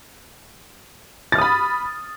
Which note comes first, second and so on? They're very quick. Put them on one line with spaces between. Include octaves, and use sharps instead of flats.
A6 F6 D#6 B5